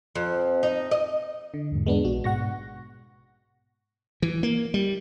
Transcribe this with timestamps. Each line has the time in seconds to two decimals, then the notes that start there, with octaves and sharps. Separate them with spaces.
0.15 F2
0.63 D#4
0.91 D#5
1.54 D3
1.72 E2 G#2
1.86 G#3 B3 D4
2.05 A#1 G#3 F#4
2.24 G#2 B2 F#5 C#6 A#6
4.22 E3
4.43 A#3
4.74 G3